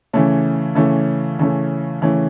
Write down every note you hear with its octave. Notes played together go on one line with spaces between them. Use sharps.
C#3 E3 A3 C#4
C#3 E3 A3 C#4
C#3 E3 A3 C#4
C#3 E3 A3 C#4